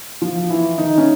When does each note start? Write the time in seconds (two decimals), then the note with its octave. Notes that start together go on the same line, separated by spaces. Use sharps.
0.22 F3 F4
0.50 E3 E4
0.78 D#3 D#4
0.98 C#4